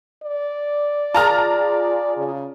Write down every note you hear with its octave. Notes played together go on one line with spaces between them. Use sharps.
D5
F4 G#4 A5 A#5 F6
C#3